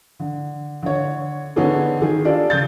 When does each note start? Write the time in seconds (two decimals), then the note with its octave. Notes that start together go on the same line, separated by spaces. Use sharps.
0.20 D3
0.82 D3 C#5
1.56 D3 B3 C#4 D#4 G#4 A4
2.02 D#3 G#4
2.25 D4 F4 G4 A4 D5
2.50 C#3 G6 A6